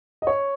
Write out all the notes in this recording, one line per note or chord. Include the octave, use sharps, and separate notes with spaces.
D#5
C#5